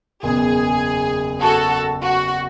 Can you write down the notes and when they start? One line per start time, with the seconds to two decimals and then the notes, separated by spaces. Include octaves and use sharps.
0.23 F#1 E2 B2 G#4
1.41 F#4 A4
2.01 F#4